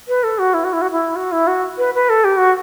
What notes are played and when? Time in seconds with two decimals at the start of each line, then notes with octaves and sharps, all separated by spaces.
0.08 B4
0.24 A4
0.39 F#4
0.54 E4
0.64 F#4
0.73 E4
0.82 F#4
0.91 E4
1.16 F#4
1.32 E4
1.47 F#4
1.78 B4
1.94 B4
2.10 A4
2.24 G4
2.37 F#4